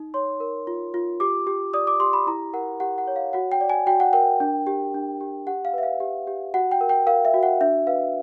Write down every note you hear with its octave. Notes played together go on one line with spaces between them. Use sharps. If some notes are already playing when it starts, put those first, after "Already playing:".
Already playing: D#4
C#5 C6
A#4
F4
F4
G4 D6
G4
D5 D#6
D6
G4 C6
B5
E4 A#5
A#4 F#5
G4 F#5
F#5
C#5
F5
F#4 F#5
G5
D5
G#5
F#4 G5
F#5
A#4 G5
D4
G4
D4
G4
G4 F#5
F5
B4 E5
F5
G4
G4
F#4 F#5
G5
A#4
G5
A#4 F5
E5
F#4
F#5
D4 E5
B4 F5